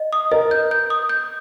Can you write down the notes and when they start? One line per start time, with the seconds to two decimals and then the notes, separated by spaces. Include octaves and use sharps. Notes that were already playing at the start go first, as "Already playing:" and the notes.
Already playing: D#5
0.13 D#6
0.31 A#4 D#5
0.51 G6
0.71 G6
0.90 D#6
1.09 G6